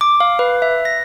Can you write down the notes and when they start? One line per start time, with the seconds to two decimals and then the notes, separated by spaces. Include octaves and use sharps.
0.01 D6
0.20 F5
0.39 B4
0.62 E5
0.85 A#6